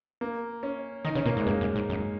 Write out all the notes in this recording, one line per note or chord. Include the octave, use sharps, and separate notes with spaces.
A#3
C#4
D#3 D#4
C#3 C#4
A#2 A#3
G#2 D#4
G#3
F#2 A#3
F#2
G#2
F#2